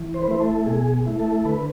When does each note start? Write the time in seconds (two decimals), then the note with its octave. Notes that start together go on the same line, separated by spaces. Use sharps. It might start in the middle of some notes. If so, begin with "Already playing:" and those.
Already playing: E3
0.14 C5
0.22 B4
0.28 A3 E4 C5
0.40 A4
0.66 B2 G#4
1.07 A3 E4
1.20 A4
1.45 D3 B4